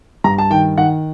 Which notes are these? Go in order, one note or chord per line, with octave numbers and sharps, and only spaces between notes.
G2 A#5
A5
D#3 G5
D#3 F#5